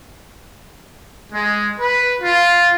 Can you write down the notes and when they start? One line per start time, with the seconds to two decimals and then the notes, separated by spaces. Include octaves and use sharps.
1.32 G#3
1.79 B4
2.20 F4